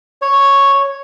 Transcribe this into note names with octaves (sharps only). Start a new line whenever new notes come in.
C#5